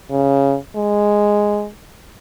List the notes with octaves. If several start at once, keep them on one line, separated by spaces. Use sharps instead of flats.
C#3
G#3